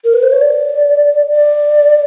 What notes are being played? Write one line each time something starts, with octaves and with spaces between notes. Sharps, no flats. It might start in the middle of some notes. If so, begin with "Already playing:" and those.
A#4
B4
C5
C#5
D5
D5